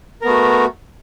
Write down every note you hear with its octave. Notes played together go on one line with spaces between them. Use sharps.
A3 B3 F#4 A#4